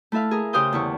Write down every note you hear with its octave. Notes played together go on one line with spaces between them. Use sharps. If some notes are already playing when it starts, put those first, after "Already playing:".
A3 E4 A4 E5 F5
G#4 A#4
C#3 G4 C5 F5 D#6 G6
E2 D3 E4 C#6